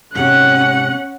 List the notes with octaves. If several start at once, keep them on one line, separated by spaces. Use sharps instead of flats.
G#2 C3 C#4 F#5 F#6